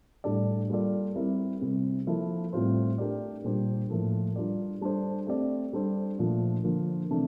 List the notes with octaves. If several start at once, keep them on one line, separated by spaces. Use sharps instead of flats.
A2 G3 D4 A4 D5
G3 A#3 F4 A4 D5
G3 C4 E4 A#4
C3 G3 C4
F3 A#3 E4 A4
A2 G3 C4 F4 C5
A3 D4 G4 A#4 D5
A#2 G3 D4 G4 C5
A2 F3 A#3 F4 A4
G3 D4 F4 A#4 D5
G3 D4 A4 C5
A3 C4 G4 D5
G3 D4 A4 C5
A#2 F3 A3 D4
D3 F3 A#3
C3 E3 A3 D4